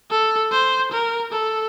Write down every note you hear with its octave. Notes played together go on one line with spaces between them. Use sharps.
A4
C5
A#4
A4